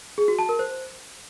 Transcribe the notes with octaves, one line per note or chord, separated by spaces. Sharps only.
G#4
F#4
A5
A#4
C5